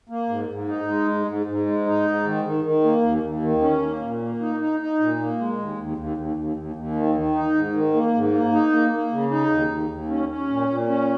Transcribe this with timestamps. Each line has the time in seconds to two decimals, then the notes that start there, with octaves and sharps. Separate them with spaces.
0.09 A#3
0.29 G#2
0.48 G#2
0.68 D#4
0.88 G#3
1.08 G#2
1.27 G#2
1.47 G#2
1.66 G#3
1.86 D#4
2.05 G#2
2.25 D#3
2.44 D#3
2.64 D#3
2.84 A#3
3.03 D#2
3.23 D#2
3.42 D#3
3.62 C#4
3.82 A#3
4.01 A#2
4.22 A#3
4.40 D#4
4.60 D#4
4.80 D#4
4.99 A#2
5.19 A#3
5.39 G#3
5.58 D#2
5.78 D#2
5.97 D#2
6.17 D#2
6.37 D#2
6.57 D#2
6.76 D#2
6.95 D#3
7.15 D#3
7.35 D#4
7.54 G#2
7.74 D#3
7.94 A#3
8.14 G#2
8.32 A#3
8.52 D#4
8.72 A#3
8.92 A#3
9.11 C#3
9.31 D#4
9.50 D#2
9.69 D#2
9.89 D#2
10.09 C#4
10.29 C#4
10.48 A#2
10.68 A#2
10.87 C#4